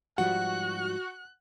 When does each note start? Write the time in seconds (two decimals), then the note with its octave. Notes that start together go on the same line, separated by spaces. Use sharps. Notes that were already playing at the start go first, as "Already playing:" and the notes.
0.18 G#2 F3 G3 F#4 F#5 F#6